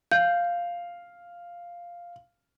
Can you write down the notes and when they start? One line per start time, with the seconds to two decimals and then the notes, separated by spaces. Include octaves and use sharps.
0.11 F5 G6